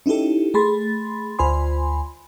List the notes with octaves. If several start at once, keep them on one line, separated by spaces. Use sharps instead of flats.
C#4 D#4 E4 G4 A4
A3 G#4 B5 C6 A6
D2 F4 C5 G#5 B5 C6